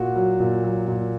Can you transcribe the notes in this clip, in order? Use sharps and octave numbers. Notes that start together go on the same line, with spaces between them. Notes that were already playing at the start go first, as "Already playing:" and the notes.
Already playing: A#2 F#4
F#3
A#2
F#3
A#2